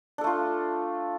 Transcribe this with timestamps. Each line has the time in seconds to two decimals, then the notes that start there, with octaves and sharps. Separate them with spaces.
0.18 D4
0.21 A4
0.24 A3
0.27 F4